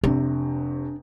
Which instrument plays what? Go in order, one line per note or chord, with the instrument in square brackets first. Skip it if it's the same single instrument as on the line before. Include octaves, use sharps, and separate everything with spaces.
[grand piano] F1 C3 [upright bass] D4